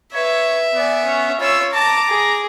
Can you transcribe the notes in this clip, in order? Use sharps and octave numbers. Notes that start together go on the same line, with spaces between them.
B4 C#5 E5
B3 D5 G#5
C#4
F4 C#5 B5 E6
A5 A#5 D6
G#4